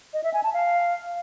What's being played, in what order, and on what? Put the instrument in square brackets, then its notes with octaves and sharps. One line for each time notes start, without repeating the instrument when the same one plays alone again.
[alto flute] D#5
E5
G#5
A5
F5